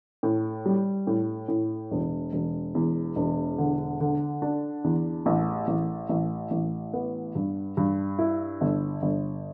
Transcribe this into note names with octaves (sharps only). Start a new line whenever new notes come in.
A2
G3
A2
A2
E1
E1
E2
E1
D3
D3
D4
E2
A1
A1
A1
A1
B3
G2
G2
E4
G1
G1